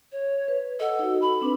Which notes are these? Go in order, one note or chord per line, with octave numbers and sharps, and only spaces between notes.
C#5
B4
A4 D#5 F#5
D#4 F#4
B5
C4 D4 B4